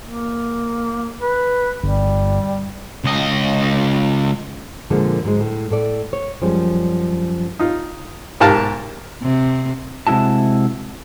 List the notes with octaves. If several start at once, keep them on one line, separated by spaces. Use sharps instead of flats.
A#3
B4
G1 G3
C#2 D#5
A#2 D3 F3 G#3 A#3 D4
F2 G#2 F#3 G#3
A2
A2 A4 D5
C#5
F#2 F3 G3 G#3 C#4
D#4 F4
B1 G#2 G4 A#4 F5 A5
C3
C3 G#3 E4 F#4 A5